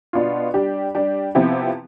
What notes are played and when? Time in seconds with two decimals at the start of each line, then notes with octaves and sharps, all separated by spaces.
0.13 B2 B3 D4 F4
0.54 G3 D4 G4
0.95 G3 D4 G4
1.35 C3 F3 B3 E4 G4